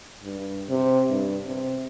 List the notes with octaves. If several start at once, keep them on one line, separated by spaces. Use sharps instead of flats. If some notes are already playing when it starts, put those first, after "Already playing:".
G2
C3
G2
C3